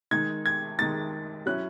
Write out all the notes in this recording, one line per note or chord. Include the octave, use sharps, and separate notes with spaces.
D#3 G#3 D#4 G#6
G#6
D#3 G#3 D#4 A6
F#3 C#4 E4 F#6